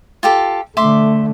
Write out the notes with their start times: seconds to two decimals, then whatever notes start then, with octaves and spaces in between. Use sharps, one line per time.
0.23 F4 G4 A4
0.77 D3 A3 E5 C6 D6